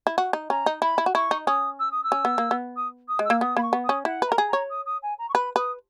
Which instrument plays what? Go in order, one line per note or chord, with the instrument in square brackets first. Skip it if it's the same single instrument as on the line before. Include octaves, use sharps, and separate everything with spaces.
[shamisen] E4
F#4
D#4
[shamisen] C#4 [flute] A#5
[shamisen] D#4
[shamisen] E4 [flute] B5
[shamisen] E4
F#4
[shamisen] E4 [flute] C#6
[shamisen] D#4
[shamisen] C#4 [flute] D#6
[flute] E6
D#6
E6
[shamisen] C#4
B3
A#3
B3
[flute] D#6
D#6
[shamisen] G#3
[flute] E6
[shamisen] A#3
[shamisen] B3 [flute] D#6
[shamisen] A#3 [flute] B5
[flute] C#6
[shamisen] B3
[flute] D#6
[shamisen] C#4
[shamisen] E4 [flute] F#5
[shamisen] B4
[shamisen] A#4 [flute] A#5
[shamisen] G#4
[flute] A#5
[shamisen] C#5
[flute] D#6
D#6
G#5
A#5
C#6
[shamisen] B4 [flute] B5
[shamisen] B4 [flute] D#6